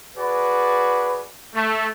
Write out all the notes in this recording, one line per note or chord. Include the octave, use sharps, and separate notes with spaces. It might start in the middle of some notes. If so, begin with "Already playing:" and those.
F#4 G#4 B4 D5
A3